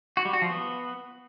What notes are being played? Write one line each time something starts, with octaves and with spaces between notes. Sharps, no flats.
F#4
G3
F#4
F3
B3